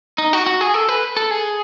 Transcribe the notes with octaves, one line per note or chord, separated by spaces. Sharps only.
D#4
F#4
F#4
G#4
A4
B4
A4
G#4